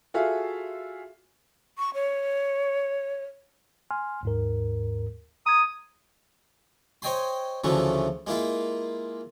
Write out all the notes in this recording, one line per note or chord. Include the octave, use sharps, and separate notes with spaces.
F4 F#4 G#4 A4 E5 F5
C#6
C#5
G#5 C6 F6
D#2 G#2 A#4
A#5 D#6 G#6
C5 C#5 D#5 G5 G#5 C6
D2 C#3 E3 F3 A3
G#3 A#3 E4 F4